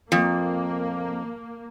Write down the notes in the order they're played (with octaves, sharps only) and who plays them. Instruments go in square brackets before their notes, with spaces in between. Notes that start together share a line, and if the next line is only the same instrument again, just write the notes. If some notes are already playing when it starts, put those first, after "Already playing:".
[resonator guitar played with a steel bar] F2 [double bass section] A#3